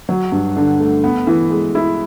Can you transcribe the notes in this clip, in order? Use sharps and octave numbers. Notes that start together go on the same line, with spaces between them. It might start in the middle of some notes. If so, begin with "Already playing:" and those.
F#3
G2
D3
A3
B3
E3
G#3
E4